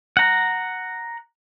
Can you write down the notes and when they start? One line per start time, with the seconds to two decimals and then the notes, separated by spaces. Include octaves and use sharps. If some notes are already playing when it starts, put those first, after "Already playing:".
0.17 F#5 A#5